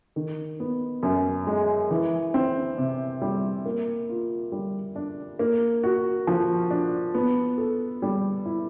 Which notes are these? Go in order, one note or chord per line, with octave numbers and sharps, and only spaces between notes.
D#3
B3
F#2
G#3
E3
C4
C3
G3
A#3
F4
G3
D4
A#3
F#4
F3
D4
B3
A4
G3
E4